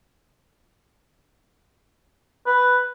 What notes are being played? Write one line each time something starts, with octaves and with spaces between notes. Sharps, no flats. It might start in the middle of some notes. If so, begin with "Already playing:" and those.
B4